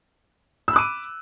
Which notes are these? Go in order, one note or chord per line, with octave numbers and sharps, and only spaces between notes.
B5 D6 E6 F#6 D#7